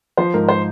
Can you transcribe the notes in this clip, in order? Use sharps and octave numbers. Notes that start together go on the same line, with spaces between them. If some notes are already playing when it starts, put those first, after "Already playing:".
F3 C5
G#2 A#4
C5